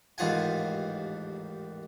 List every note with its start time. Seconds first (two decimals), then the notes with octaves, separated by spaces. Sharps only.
0.18 A1 D#2 G#2 F4 F#5 G#5